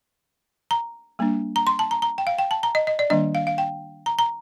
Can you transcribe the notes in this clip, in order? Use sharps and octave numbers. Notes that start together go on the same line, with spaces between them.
A#5
G3 A#3 D4
A#5
C6
A5
A#5
A#5
G5
F5
G5
A5
A#5
D#5
D#5
D5
D#3 G3 A#3 D4 D#5
F5
F5
G5
A#5
A#5